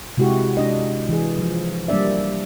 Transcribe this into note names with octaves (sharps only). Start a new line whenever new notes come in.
C3 G#3 E4 F#4 G4
G#3 D4 D#5
E3 G#4
F3
G3 A#3 D4 D5 E5